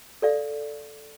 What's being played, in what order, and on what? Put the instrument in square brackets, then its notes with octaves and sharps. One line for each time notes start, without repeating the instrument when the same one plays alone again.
[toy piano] A4 D5 F5